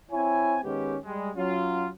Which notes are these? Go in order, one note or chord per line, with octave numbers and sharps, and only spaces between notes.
C4 E4 C#5 G#5
D#3 G#3 B3 C#4 G4
G3 G#3
F#3 C#4 F4